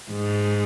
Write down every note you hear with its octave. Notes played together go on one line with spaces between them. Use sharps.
G#2